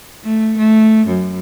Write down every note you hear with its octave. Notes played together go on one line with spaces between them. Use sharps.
A3
A3
F#2